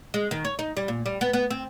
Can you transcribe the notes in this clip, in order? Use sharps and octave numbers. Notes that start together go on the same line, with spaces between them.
G#3
D#3
C#5
D#4
G3
A#2
G3
B3
B3
C4